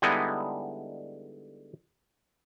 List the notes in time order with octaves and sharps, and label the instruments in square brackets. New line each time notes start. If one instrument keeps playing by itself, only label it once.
[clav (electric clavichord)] D3 G3 G#3 B3 D#4 E4